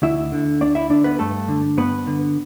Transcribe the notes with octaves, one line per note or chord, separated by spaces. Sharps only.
D2 E4 E5
D3
D2 D4 D5
E4 E5
D3 D4 D5
B3 B4
G2 A3 A4
D3
G2 B3 B4
D3